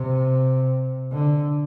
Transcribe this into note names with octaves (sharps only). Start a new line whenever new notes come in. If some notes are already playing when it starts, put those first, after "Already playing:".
Already playing: C3
D3